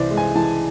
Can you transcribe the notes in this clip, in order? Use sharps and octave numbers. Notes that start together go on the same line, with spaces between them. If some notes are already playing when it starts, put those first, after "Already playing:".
Already playing: C2 E3 C5 D5
G#3
G#5
E3 A5